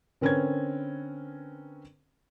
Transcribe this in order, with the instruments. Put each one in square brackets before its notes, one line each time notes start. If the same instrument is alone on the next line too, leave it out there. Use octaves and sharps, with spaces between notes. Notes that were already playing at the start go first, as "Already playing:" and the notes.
[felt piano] D3 C4 C#4 A#4 B4 G#6